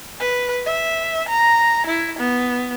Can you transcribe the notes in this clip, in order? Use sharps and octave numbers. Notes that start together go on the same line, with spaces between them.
B4
E5
A#5
E4
B3